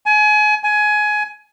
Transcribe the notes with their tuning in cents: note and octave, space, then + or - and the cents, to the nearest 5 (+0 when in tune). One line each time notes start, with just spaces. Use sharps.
G#5 +30
G#5 +20